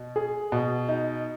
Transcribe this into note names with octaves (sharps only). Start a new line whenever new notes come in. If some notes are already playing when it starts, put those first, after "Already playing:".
Already playing: B2
G#4
B2
D#4